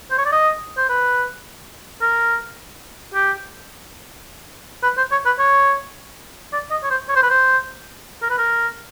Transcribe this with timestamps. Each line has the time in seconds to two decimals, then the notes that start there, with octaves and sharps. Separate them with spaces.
0.11 C5
0.18 C#5
0.25 D5
0.32 D#5
0.77 C5
0.89 B4
2.01 A#4
3.14 G4
4.83 B4
4.97 C5
5.12 C#5
5.25 B4
5.39 C#5
6.53 D5
6.71 D#5
6.83 C#5
6.90 C5
7.09 C#5
7.16 C5
7.23 B4
7.30 C5
8.22 A#4
8.30 B4
8.38 A#4